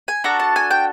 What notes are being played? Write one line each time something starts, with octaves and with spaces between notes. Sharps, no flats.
G#5
D4 F#4 A4 A#5
A5
G#5
G5